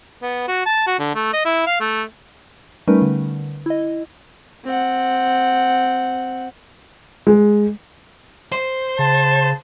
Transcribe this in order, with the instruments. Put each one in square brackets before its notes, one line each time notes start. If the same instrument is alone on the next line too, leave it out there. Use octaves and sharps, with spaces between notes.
[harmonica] B3
F#4
A5
F#4
D3
A3
D#5
E4
F5
A3
[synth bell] G3 A3 C#4 D#4 A#4 B4
D3
E4 D#5
[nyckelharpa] C4 F#5
[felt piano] G#3
[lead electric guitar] C5
[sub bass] C#3 [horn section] A5